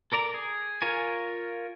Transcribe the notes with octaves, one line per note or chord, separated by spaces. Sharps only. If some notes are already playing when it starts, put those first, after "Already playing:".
A4 A#4 D5 A#5
G#4
F4 A#4 C#5 G#5